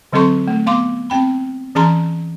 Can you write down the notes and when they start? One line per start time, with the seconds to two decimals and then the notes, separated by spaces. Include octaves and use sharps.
0.12 D3 F#3 C4 A4 C6 C#6
0.48 A3
0.66 B3 F5 C6 D6
1.10 C4 G5 B5
1.75 E3 C#4 G#4 A5 A#5 C6